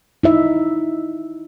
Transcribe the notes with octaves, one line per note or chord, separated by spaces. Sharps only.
D#4 E4 E5